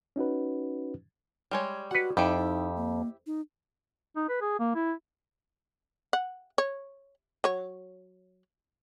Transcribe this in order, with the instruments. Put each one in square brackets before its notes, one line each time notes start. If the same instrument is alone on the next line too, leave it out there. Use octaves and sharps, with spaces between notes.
[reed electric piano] C#4 D#4 F#4 B4
[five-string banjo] G3 G#3 C#5
[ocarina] F#4 [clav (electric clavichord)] B4 F#5
[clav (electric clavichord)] F2 [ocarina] D#4 [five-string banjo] E4 G4
[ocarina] D#4
A#3
D#4
[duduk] D#4
B4
G#4
A#3
E4
[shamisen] F#5
C#5
F#3 C#5